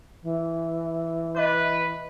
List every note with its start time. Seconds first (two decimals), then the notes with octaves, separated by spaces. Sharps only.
0.23 E3
1.36 B4 D#5 E5 D6